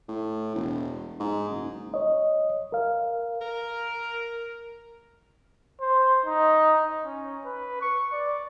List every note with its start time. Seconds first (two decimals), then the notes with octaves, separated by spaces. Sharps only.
0.08 A2
0.55 E1
1.20 G#2
1.49 F#1
1.94 C#5 D#5
2.72 A#4 F5
3.41 A#4
5.80 C5
6.26 D#4
7.04 C#4
7.45 B4
7.81 C#6
8.12 D5